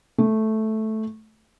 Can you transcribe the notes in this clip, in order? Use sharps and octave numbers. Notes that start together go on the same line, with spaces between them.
A3